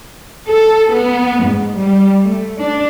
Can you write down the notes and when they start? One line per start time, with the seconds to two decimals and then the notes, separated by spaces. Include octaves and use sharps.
0.47 A4
0.90 B3
1.41 G#2
1.76 G3
2.23 A3
2.56 D4